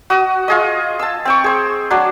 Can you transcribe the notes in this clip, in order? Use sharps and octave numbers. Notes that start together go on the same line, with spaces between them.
F#4 D#6
F4 G#4 D#5
A5 E6
C4 G5 C#6
G#4 C5
F#3 D4